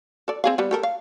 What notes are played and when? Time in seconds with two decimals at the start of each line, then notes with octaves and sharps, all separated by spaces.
0.28 A4 D5
0.44 C4 G#4 F5
0.58 G3 B3
0.71 G4 A4 A#4
0.83 F5